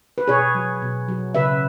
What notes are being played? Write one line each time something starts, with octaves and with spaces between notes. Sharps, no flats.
B4
B2 G#4 C#5
F#3
B2
F#3
C#3 B4 E5